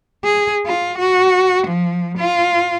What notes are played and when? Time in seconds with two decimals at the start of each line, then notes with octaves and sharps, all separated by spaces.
0.24 G#4
0.66 F4
0.98 F#4
1.67 F3
2.18 F4